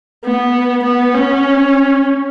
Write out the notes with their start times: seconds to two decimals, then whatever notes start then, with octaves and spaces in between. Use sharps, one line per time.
0.25 B3
0.84 B3
1.14 C#4